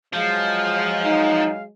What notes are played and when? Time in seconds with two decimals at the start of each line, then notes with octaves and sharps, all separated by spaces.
0.14 F3 F#3 G#3 F5
1.04 D#4